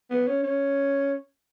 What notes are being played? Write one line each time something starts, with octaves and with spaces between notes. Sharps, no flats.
B3
C#4
C#4